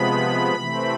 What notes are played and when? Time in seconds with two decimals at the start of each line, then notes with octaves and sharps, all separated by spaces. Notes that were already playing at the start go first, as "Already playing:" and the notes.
Already playing: C3 F3 G#3 B3 B5
0.55 C3 E3 A3 C4